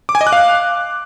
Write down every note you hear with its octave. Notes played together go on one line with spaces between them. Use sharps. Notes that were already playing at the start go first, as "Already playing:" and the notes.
D6
G#5
D#5
F#6
F5